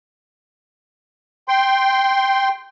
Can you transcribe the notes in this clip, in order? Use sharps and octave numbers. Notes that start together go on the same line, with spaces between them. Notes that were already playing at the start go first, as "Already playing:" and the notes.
G5 C6